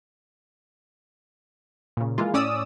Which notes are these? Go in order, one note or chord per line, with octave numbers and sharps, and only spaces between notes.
A#2 C#3
E3 G#3 A#3 F4
A2 C#4 D5 D#6 E6